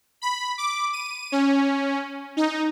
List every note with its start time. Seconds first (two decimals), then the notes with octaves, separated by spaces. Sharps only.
0.22 B5
0.58 D6
0.93 D#7
1.32 C#4
2.37 D#4